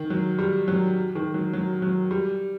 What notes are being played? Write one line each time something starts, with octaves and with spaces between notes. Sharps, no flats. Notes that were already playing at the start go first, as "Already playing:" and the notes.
Already playing: D#3
F#3
G3
F#3
D#3
F#3
F#3
F#3
G3